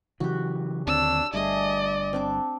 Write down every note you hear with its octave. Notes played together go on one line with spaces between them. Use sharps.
C#3 E3 F#3 F#4 G4
D#2 D3 C4 D4 C#5 A5 E6
G1 G2 A3 G#4 D5 D#5
C4 D4 D6